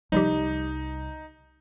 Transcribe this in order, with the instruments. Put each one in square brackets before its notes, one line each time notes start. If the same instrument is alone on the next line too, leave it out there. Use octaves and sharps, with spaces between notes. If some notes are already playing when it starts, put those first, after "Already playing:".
[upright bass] C2 [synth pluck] F3 G3 G4 [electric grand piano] D#4